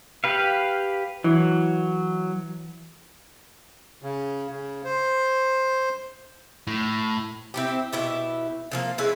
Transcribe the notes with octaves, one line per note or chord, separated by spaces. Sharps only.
G4 B4 F5
E3 F#3
C#3
C#3
C5
A2
C4 E4 G4
B2 E4 G4
D3 F3 A#3
G#3 C#4 E4 B4